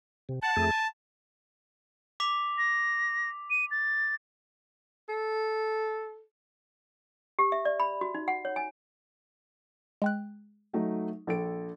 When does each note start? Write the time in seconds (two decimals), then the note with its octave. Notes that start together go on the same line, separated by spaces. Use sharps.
0.29 C3
0.43 F#5 A5
0.56 F2 A3 G#4
0.72 G#5
2.20 D6 B6 F7
2.58 A#6
3.50 D#7
3.71 A6
5.09 A4
7.39 G4
7.52 E5
7.65 D5
7.80 B5
8.01 F#4
8.14 D#4
8.28 F#5
8.45 C#5
8.56 G#5
10.02 G#3 G5 F#6
10.73 F#3 A3 D#4
11.27 A#1 A4 D7